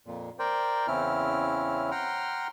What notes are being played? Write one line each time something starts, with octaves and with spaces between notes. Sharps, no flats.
F2 A#2
A#4 C5 D5 G5
E2 C#3 C4 C#4 E4 F6
F#5 G5 A#5 C6 F6